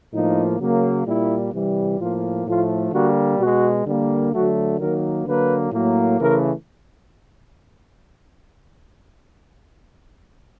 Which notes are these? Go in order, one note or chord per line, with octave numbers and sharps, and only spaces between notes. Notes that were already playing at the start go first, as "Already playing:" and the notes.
A2 F3 A#3 D#4
C#3 F#3 A#3
A#2 G3 A#3 E4
C3 E3 G3
A2 F3 A#3 F4
A2 F3 A3 F4
D3 G3 A#3 F#4
B2 G#3 F#4
D3 G3 A#3
D3 F#3 A3 F#4
D#3 F#3 A#3 A#4
D3 F#3 A#3 B4
A2 F#3 A#3
C#3 E3 A3 A#4